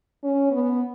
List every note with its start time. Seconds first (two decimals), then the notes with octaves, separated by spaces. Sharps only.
0.24 C#4
0.52 B3